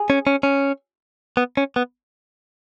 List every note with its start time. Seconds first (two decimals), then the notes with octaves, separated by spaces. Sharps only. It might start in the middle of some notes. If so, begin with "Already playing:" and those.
Already playing: G#4
0.10 C#4
0.27 C#4
0.43 C#4
1.37 B3
1.57 C#4
1.76 B3